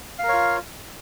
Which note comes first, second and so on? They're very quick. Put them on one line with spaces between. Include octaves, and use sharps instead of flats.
F5 A#4 C#5 F4